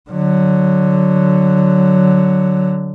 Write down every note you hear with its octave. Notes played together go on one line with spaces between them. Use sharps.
D3 F#3